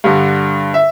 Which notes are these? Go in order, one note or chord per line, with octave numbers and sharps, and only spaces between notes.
G2 D3
E5